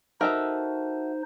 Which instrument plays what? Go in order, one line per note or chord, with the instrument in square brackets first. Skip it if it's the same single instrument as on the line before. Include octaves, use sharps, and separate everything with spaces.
[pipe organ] D#4 C5 [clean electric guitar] F#4 A4 E5 [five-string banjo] A#4 D#5 A#5